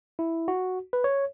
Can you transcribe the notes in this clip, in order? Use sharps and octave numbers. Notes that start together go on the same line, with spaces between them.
E4
F#4
B4
C#5